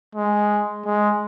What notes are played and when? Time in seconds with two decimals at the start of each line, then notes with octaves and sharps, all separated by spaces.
0.15 G#3
0.85 G#3